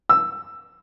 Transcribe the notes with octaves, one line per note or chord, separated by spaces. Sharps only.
E6